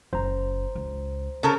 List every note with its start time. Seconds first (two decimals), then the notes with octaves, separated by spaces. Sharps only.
0.13 F#1 C5 A#5
0.75 C#2
1.43 C#3 A4 A#4